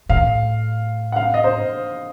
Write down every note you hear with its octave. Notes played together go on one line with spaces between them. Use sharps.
A2 F5
F#5
F5
D#5
C5